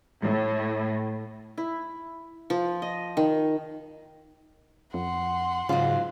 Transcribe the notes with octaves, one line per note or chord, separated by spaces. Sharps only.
A2
E4
F3
D#5
D#3
F2 F#5 C6
G#2 C#3 F#3 F4